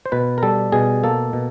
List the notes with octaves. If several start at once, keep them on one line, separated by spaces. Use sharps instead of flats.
C5
B2 B4
A#4
G3 A4
B2 G#4
A#3 A4
B2